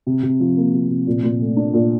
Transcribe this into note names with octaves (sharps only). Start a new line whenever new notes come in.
C3
C3
F3
A#3
C3
C3
A#2
A#2
A3
D4
A#2